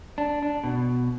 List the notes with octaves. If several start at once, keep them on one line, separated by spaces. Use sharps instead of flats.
D4
D4
B2